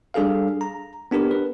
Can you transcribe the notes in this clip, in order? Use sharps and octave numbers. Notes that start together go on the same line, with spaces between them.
G3 D4 G#4 A4 F5
A#5
B3 D4 G4 A#4
B4